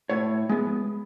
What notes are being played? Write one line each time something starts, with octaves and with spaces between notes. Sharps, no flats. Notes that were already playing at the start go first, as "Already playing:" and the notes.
A2 C#5
G#3 B3